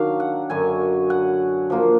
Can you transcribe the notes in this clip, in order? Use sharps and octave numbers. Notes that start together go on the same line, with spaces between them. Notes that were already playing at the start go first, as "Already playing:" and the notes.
Already playing: D#3 F#3 D4 F5
F#5
F#2 D3 F#3 G#5
F#5
F3 A#3 F4